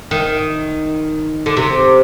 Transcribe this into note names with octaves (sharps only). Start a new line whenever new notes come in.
D#3
D3
C3